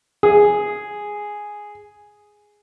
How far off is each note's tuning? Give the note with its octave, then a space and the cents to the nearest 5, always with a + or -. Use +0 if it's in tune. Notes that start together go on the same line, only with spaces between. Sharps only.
G#4 +0